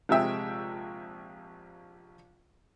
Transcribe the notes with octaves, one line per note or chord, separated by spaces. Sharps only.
A#1 C3 G#3 E5 G5